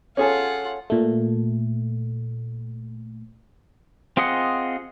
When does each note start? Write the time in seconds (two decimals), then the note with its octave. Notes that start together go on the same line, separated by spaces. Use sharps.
0.17 C#4 F4 G#4 A4 C#5 F#5 G#5
0.90 A#2 A3
4.17 C4 F4 G#4 D#5 F#5